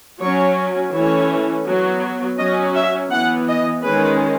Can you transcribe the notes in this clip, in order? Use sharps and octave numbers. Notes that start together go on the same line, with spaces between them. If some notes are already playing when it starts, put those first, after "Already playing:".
F#3 C#4 C#5
E3 A3 C#4 C#5
F#3 B3
F#3 C#4 D#5
E5
E3 B3 F#5
D#5
D#3 G#3 C#4 B4